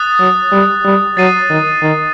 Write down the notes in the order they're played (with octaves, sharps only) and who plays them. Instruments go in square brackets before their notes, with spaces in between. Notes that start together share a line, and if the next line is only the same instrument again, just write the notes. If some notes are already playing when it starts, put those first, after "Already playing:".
Already playing: [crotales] D#6 F#6 A6
[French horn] F#3
G3
G3
[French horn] F#3 [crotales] A6 C7 D#7
[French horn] D#3
D#3